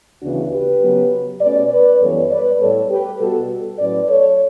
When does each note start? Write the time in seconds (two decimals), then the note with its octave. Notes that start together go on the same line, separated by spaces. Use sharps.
0.22 D2 C#3 E3 B3 D4 F#4
0.52 G4 B4
0.82 C#3 F#3 B3
1.41 B2 A3 C#4 B4 D5
1.71 B4 D5
2.01 F#2 E3 G3 B3 A4 C#5
2.31 B4 D5
2.60 A2 G3 B3 A4 C#5
2.89 G4 B4
3.20 B2 G3 B3 F#4 A4
3.79 A2 F#3 C#4 B4 D5
4.08 A4 C#5